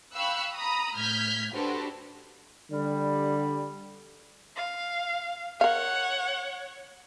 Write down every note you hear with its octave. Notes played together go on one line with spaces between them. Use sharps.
F5 G5 B5 C#6 E6 F#6
A#5 B5 D#6
A2 F6 G6 G#6 B6
D4 F#4 G4 A4 B4 C5
D3 G3
F5
A#4 C#5 F5 F#5